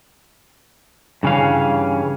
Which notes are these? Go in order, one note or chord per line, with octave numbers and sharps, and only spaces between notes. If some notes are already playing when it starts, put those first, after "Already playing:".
G2 C#3 E3 C#4 F5